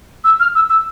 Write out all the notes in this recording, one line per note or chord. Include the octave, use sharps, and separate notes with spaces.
E6
F6
E6
E6